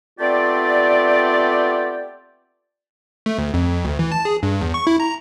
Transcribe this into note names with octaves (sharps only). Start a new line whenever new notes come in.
A3 B3 C4 F4 G4 D5
A3
D2
F2
D2
E3
A5
G#4
G2
E2
C#6
E4
A#5